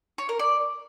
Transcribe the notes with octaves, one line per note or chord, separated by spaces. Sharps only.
C#5
A#4
D5